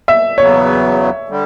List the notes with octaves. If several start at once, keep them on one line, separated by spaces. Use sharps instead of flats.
E5
E2 C#3 F#3 B3 C#5
D3 G3